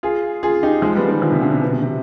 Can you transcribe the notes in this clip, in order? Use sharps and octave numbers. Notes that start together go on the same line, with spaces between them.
F4 G#4
F4 G#4
D#4 G4
F3 G#3
G3 B3
D#3 G3
D3 F3
C3 D#3
B2 D3
C3
B2
C3
C3